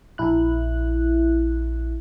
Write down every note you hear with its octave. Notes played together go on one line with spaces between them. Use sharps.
A#1 E4 F#6